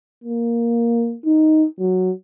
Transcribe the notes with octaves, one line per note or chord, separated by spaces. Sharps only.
A#3
D#4
F#3